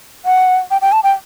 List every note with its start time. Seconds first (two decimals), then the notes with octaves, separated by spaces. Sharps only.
0.25 F#5
0.71 G5
0.82 G5
0.92 A5
1.03 G5